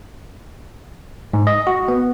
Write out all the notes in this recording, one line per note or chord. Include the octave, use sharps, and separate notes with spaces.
G#2
D#5
F#4
B3